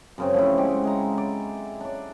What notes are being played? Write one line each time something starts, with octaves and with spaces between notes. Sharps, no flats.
F#2 C#3 C4
F3 A3 E4
G#3 G4 F#5
G#3 A#5
D5
D4 D5